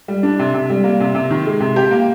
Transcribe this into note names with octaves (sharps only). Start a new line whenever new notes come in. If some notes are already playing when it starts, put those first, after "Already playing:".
G3
D4
C3
C3
G3
A#3
C3
C3
D#3
G#3
C3
G4
A#3